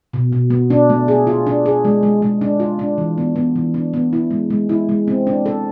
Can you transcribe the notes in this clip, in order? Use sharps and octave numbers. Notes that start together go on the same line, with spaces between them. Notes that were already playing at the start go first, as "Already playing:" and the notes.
B2
B2
B3
D4
A3
G#4
F4
D4
G#4
G#3
G#3
G#3
D4
F4
D4
E3
B3
B3
E3
D4
B3
E4
G#3
G#3
E4
G#3
C4
D4
A4